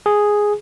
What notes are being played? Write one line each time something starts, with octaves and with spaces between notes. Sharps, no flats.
G#4